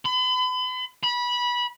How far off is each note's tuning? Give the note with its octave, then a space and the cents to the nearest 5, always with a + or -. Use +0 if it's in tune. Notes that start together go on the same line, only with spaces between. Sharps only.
B5 +40
B5 -20